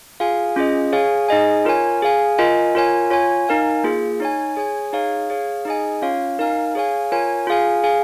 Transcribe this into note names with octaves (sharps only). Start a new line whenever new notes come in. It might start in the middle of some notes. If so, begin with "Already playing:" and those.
F4 G#4 F5 G#5
C#4 F4 G#4 D#5
G#4 C#5 F5 G#5
D#4 G#4 D#5 G#5
F4 A#4 C#5 G#5
G#4 F5 G#5
F4 A#4 D#5 G#5
F4 A#4 C#5 G#5
F4 C#5 G#5
D#4 A#4 F5 G#5
A#3 F4 G#4
D#4 C#5 G#5
G#4 C#5 G#5
D#4 G#4 C#5 F5
G#4 C#5 F5
D#4 G#4 D#5 G#5
C#4 F4 C#5 F5
D#4 A#4 F5 G#5
G#4 C#5 F5 G#5
F4 A#4 C#5 G#5
F4 G#4 F5 G#5
G#4 F5 G#5